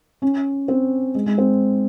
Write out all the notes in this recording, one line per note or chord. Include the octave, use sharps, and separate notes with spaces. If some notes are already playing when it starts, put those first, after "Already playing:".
C#4
C4
G#3
G#3
C4